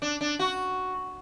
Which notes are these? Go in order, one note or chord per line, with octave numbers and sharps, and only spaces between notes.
D4
D4
F#4